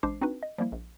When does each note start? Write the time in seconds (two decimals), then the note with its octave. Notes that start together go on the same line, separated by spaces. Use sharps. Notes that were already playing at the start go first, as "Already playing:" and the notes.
0.03 A1 G#3 D4 C5 D6 C7
0.21 C4 D4 D#4 F#4 B4
0.43 D#5
0.58 F3 G3 A#3 E4
0.72 A#1